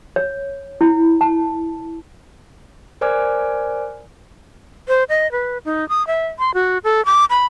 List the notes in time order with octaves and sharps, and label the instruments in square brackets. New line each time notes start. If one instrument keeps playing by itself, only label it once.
[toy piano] C#5
E4
A5
[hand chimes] A#4 C5 D5 G#5 D6 F6
[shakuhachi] C5
D#5
B4
D#4
D#6
E5
C6
F#4
A4
D6
B5